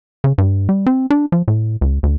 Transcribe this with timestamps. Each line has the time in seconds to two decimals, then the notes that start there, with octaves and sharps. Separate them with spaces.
0.24 C#3
0.38 G2
0.69 G3
0.86 C4
1.10 D4
1.32 F3
1.48 A2
1.81 C#2
2.03 D2